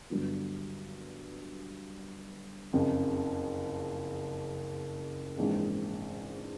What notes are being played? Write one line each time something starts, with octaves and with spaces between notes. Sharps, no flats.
G2 D3 F#3 B3
F#1 F2 C#3
A#1 G#2 E3 G#3 C4